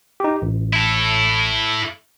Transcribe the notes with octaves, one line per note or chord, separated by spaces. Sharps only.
D#4 G4
A1
E4 A4